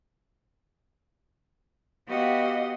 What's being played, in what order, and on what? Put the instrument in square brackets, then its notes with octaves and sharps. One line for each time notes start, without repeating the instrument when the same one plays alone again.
[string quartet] B3 F#4 G4 D#5 F5 F#5